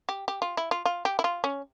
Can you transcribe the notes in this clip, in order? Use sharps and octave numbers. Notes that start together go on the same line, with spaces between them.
G4
G4
F4
E4
F4
F4
G4
E4
F4
C#4